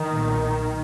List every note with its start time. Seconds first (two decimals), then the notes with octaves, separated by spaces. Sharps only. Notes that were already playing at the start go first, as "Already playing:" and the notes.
Already playing: D#3
0.10 B1 A#2